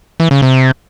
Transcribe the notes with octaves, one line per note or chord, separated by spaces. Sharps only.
E3
C#3
C3